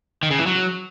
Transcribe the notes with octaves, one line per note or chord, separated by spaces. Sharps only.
D#3
C#3
E3
F#3